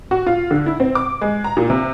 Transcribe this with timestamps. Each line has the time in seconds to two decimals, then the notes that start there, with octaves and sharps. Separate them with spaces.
0.11 F#4
0.27 F4
0.51 D3
0.66 E4
0.80 C4
0.95 D6
1.21 G#3
1.44 A#5
1.57 A#2
1.70 C3